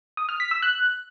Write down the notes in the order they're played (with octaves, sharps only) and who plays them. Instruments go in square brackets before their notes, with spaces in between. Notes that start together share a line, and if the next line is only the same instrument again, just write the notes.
[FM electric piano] D#6
F6
B6
E6
F#6